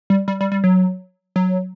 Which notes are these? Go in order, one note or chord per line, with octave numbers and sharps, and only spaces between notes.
G3
G3
G3
G3
F#3
F#3